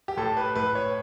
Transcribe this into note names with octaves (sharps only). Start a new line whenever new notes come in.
G4
A2 A4
B4
A2 B4
C#5